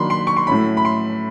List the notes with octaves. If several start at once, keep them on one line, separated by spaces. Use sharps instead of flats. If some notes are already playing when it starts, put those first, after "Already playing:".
Already playing: D#3 F#3 A#3 D4 B5 C6
C6
C#6
C6
A2 F#3 A3 C#4 E4 B5
B5
C6